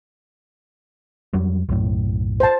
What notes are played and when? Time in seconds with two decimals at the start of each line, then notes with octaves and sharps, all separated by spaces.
1.34 F2 F#3 G3
1.69 B1 F#2 A2
2.40 C5 A5